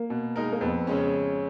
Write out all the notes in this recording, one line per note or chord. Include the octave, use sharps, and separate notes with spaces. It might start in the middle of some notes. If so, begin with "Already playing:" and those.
Already playing: A#3
B2
G#3 D#4 A#4
A#3
F2 B3
C#3 G#3 C#4